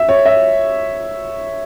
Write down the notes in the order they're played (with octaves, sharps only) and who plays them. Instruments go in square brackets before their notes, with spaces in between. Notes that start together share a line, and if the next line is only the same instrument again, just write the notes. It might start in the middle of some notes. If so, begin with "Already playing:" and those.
Already playing: [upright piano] E5
C#5
E5